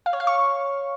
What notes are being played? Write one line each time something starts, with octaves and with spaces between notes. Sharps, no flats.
F5
C#5
F5
C#6